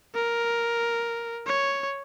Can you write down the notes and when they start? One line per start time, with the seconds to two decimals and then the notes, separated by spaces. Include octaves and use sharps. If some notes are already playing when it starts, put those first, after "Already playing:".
0.14 A#4
1.47 C#5